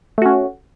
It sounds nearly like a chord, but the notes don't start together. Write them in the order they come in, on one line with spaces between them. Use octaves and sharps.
A3 F#4 C#4